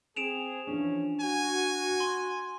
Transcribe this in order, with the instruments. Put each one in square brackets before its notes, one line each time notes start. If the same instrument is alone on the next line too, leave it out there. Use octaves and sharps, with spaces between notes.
[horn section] C4 G#4 [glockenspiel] D7 E7 F7
[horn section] E3 F3 C#4 [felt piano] D4
[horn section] F#4 [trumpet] G#5
[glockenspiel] C6